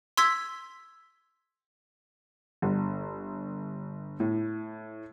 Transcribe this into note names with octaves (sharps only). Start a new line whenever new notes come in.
C6 E6 G#6 B6
G1
A2